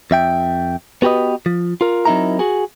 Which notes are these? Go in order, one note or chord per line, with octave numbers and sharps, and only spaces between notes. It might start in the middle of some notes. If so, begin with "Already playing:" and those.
F2 E5 G5
B3 F#4 G4 B4 D#5
F3
F4 A#4
F#3 C4 D#4 E4 A#4 A#5
F#4 G#4